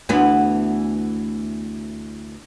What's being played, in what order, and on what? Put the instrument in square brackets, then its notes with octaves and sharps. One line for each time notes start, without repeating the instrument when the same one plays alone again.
[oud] D2 E3 B3